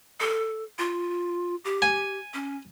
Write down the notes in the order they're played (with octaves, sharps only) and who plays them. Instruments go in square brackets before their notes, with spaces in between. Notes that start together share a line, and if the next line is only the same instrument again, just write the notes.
[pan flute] A4
F4
G4
[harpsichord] G#5
[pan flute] C#4